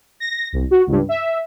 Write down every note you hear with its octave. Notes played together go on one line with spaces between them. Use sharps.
A#6
C2
F#4
C#2 G2
E5